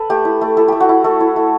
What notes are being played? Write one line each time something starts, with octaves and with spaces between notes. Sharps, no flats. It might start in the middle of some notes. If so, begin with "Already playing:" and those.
Already playing: A4 B4
A3 G4
E4
A3
E4 A4
A3 G4
F#4
E4
A3 A4
E4
A3